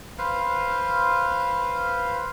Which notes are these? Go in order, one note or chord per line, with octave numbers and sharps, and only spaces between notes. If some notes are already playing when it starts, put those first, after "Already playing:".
B4 C5 F5